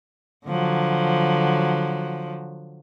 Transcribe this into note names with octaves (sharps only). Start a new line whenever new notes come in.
D3 F3 F#3